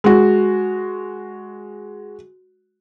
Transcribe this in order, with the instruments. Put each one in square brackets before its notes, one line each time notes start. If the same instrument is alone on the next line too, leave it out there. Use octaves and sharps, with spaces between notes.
[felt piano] G#3 F#4